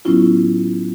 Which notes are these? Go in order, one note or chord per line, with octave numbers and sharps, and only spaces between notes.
A2 F#3 B3 C#4 E4 F4